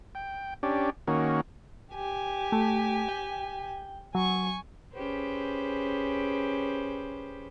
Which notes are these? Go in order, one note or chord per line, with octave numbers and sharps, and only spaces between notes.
G5
C#4 D4 G4
D#3 A#3 C#4 F#4
G4 G#5
A3
G5
F#3 G#5 C#6
C#4 G4 G#4 B4 C5